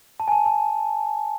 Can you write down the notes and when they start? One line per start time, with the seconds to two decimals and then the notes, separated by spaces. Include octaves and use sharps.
0.20 A5
0.28 G#5
0.32 A5
0.46 A5